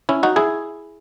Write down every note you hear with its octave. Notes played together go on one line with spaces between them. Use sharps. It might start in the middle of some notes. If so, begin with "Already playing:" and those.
C#4 E4
D#4 F#4
E4 G#4